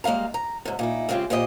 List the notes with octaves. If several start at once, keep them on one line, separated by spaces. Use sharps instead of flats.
G3 G#3 A#3 F5 A#5
A#5
G#2 C3
A#2 D#4 E4
C#3 G#3 C4 F4 G4
A#2 G4 C5 D#5